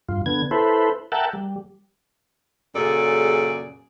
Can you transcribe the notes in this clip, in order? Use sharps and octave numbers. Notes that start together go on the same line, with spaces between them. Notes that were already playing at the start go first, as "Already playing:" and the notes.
G2 F4
D3 B3 G#6
E4 A4 B4 C5
A#4 E5 F#5 G5 A5
G3
F#2 A#2 C#3 G#4 A4 D5